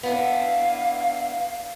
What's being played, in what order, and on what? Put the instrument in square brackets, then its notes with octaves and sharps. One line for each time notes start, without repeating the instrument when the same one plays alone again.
[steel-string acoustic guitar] B3 D4 E4 [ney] F5